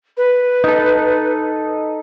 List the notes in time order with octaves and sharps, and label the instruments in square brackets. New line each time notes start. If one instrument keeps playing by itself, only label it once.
[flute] B4
[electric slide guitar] D#4 A4